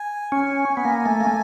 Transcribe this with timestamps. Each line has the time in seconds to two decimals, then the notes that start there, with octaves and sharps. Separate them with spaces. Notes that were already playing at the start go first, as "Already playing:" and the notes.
Already playing: G#5
0.32 C#4
0.77 B3
0.85 A#3
1.06 A3
1.21 A#3
1.27 A3